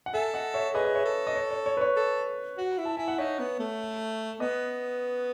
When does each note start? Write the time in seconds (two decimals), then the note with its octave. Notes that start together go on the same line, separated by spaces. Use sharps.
0.06 F#5
0.14 A4 E5 G#5
0.34 D#5 F#5
0.54 C#5 E5
0.74 G#4 B4 D#5
0.85 D#5
0.94 C#5 E5
1.05 A4
1.27 D#5
1.36 C#5
1.51 C#5
1.66 C#5
1.77 B4
1.81 C#5
1.96 A4
2.57 F#4
2.78 E4
2.85 A5
2.97 E4 G#5
3.08 F#5
3.18 D#4 C#5 E5
3.39 B3
3.59 A3
4.40 B3 B4 D#5